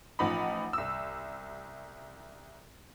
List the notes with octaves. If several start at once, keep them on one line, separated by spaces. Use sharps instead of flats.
A1 F3 D#4 F#5 B5
C2 E6